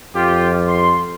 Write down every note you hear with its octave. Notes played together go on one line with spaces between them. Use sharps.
F2 F4 G4
C6